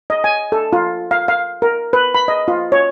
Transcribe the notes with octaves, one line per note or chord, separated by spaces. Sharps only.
D#5
G#5
A4
F4
F5
F5
A#4
B4
B5
D#5
F4
C#5